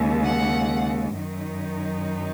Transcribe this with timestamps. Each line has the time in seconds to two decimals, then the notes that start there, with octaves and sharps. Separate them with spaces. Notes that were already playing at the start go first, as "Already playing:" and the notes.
Already playing: D#2 C#3 G#3
0.23 F#5
1.15 F#2 D#3 F#3 D#4